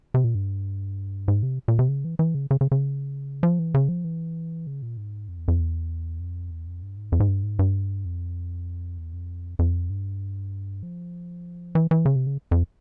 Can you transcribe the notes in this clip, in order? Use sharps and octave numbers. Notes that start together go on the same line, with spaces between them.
C3
A#2
G2
G#2
C3
A#2
C3
C#3
E3
E3
C#3
C#3
C#3
C#3
F3
E3
C#3
F3
E3
C#3
A#2
G#2
F2
E2
F2
E2
F2
E2
F2
G2
G#2
F2
G#2
G2
G#2
G2
F2
E2
F2
F2
G2
F3
E3
E3
C#3
C3
C#3
F2